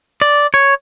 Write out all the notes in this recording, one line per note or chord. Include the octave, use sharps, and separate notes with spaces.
D5
C#5